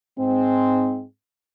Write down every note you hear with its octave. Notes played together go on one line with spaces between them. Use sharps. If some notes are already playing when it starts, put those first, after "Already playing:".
G#2 G#3 C4